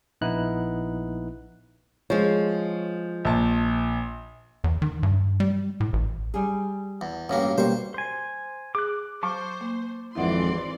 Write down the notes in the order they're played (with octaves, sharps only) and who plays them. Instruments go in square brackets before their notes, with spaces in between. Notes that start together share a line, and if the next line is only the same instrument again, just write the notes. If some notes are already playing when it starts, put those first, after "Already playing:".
[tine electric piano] A#1 B3 D#4 E4 F#6
[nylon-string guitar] F3 G#3 [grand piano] C#5
[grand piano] A#1 A5
[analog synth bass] E2
D#3
G2
G3
A2
A1
[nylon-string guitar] G3 G#4
[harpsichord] E2
[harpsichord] A1 G2 A#3 [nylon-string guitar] C#4 F#4 G4
[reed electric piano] B2 G3 A#3 [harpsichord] C5 C#6
[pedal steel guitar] C5 G#5
[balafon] G#4 [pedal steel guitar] D6 F#6
[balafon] F#3 [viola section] C5 [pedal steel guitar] A5 C#6 D6
[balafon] A#3
[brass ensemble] G#1 F2 [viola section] E3 D5 C6 [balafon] E4 E5 F#5